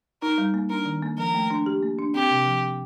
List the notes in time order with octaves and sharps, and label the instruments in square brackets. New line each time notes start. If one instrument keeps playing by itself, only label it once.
[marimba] D#4 [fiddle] A#4
[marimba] G3
A#3
[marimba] D4 [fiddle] A#4
[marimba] D#3
A#3
[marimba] F3 [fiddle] A#4
[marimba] A3
D4
G4
A#3
D4
[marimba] C4 [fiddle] G4
[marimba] C3
F3